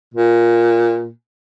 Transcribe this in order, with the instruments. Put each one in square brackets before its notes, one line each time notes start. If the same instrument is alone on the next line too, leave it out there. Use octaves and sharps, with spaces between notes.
[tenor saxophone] A#2